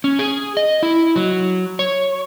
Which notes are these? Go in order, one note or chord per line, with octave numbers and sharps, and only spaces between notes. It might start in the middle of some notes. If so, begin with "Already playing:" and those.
C#4
G#4
D#5
E4
F#3
C#5